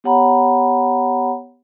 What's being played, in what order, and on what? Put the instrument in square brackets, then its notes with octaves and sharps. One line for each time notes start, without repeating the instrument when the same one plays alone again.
[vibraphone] B3 G4 C#5 F#5 A#5 B5